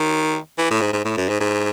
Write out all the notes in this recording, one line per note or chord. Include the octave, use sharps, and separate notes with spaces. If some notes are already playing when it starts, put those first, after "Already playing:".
Already playing: D#3
E3
A2
G#2
G#2
A2
F#2
G#2
G#2